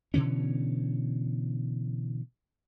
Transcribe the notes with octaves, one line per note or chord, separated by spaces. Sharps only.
B2 D3 E3 C#4